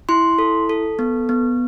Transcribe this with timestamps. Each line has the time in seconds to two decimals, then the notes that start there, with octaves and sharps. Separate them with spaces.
0.09 E4 C6
0.39 A4
0.70 A4
0.99 B3
1.29 B3